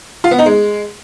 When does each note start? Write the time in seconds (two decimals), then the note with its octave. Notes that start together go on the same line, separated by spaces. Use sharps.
0.24 F4
0.31 B3
0.39 D#4
0.46 G#3